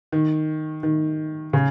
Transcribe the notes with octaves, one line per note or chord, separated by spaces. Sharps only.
D#3
D#3
C#3